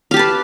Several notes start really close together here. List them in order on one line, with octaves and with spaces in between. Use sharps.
F5 G4 A5 B4